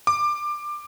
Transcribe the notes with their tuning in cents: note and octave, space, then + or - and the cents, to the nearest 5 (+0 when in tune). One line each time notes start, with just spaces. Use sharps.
D6 +20